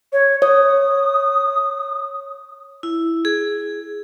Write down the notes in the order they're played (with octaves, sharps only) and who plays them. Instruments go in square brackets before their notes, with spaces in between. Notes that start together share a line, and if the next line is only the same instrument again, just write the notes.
[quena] C#5
[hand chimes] C#5 [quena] D#6
[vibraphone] E4
G#4